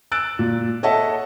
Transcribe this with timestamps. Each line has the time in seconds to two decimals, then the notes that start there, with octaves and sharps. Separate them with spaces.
0.12 E6 F#6 A6 D7
0.39 A#2
0.83 A4 C#5 D#5 E5 F#5 A5